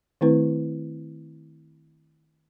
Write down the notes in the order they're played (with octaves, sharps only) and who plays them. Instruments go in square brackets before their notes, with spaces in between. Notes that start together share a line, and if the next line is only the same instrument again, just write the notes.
[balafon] D#3 A3 C4 E4 B4